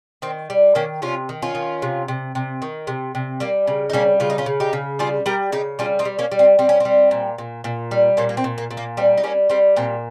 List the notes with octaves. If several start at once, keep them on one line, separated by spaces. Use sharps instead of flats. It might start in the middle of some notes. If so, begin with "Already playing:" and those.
D#3 C4
G3
D#3 A#3 C#4
C3 C#4 F4
D#3
C#4 F4
D#3
C3
C3
C3
D#3
C3
C3
G3 A#3
C#3
D#4
G3 A#3 C#4
C#3 F4
D#4
C#4 F4
C#3
D#4 G4
C#3
G3 F4 G#4
G3 G4 A#4
C#3 D#4 G4
G3 C#4 F4
C4 D#4
G3
A#3 C#4
G3
C4
G3 C4
C#4
G3 C4
A#2
A#2
A#2
G3
A#2 A#3 C#4
A#3
C4
A#2
A#3
A#2
A#3
G3 C4
D#4
G3 A#3 C#4
G3 C4
A#2 C4